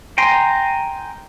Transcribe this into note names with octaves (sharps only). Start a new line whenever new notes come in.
G5 G#5 A#5 C6